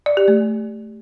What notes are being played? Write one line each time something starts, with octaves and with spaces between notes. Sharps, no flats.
D5
G4
A3